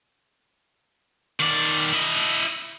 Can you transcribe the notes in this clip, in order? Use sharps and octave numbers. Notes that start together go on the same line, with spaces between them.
D#3 D5
E4 D#5